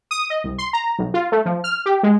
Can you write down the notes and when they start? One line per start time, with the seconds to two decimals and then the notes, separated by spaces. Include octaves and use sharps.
0.11 D#6
0.30 D#5
0.44 C2
0.58 C6
0.73 A#5
0.99 B1
1.14 F4
1.32 A3
1.46 F3
1.64 F6
1.86 G4
2.03 G#3